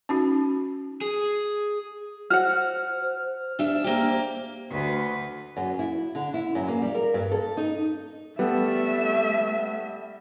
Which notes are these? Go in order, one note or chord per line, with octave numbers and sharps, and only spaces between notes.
C#4 D#4 F#4
G#4
F#4 C5 F#5 F6
D4 G4 E5
A#3 G4 C5
D2 B4
F#2
E4
D3
E4
F#2
A#3
G3
A#4
G2
A4
D#4
G3 A3 B3 A4 E5